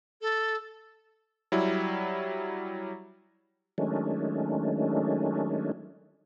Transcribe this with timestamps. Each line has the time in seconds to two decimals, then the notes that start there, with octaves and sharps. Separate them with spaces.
0.21 A4
1.52 F#3 G3 E4
3.78 D#3 F#3 G#3 A3 C#4 D4